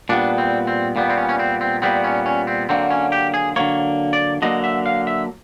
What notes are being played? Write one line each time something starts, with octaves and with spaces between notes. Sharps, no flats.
A#2 G3 B3 D4
C4
C4
A#2 G3 B3
C4
C#4
C#4
C4
C4
A#2 G3 B3 C4
C#4
C#4
C4
D3 F#3 A#3 C4
C#4
G4
G#4
D3 F#3 A#3 C#5
D5
D3 F#3 A#3 D#5
E5
F5
E5